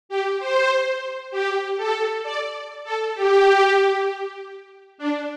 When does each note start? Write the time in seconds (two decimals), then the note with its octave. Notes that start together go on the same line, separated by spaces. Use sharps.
0.09 G4
0.40 C5
1.31 G4
1.77 A4
2.24 D5
2.84 A4
3.15 G4
4.98 D4